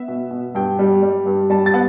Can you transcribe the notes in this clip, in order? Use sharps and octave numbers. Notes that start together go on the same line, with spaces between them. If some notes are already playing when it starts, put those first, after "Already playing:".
Already playing: B3 E5
B2
B2
G2 G5
G3
G3
G2
G3 A5
A6
B3